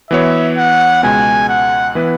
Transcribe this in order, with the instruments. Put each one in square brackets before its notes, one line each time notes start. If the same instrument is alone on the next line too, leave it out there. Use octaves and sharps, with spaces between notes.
[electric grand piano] E3 B3 F#4 C#5 [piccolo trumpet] E5
[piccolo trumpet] F#5
[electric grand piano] C#2 B2 G#3 [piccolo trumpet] G#5
[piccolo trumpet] F#5
[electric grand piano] E3 B3 E4 B4